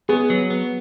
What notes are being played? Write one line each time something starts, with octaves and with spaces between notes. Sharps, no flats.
B3 G#4
F#3
B3